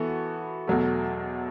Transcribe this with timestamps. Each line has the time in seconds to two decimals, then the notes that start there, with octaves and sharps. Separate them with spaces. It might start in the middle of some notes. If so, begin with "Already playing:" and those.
Already playing: E3 B3 F#4 A4
0.67 E2 B2 F#3 A3